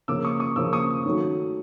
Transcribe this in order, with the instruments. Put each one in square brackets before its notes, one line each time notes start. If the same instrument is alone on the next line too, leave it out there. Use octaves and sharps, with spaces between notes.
[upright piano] C#3 F3 A#3 [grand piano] D6 E6
[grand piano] C#6 D#6
C#6 D#6
[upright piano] C#3 F3 A#3 [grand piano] D6 E6
[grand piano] C#6 D#6
[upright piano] D#3 F#3 A3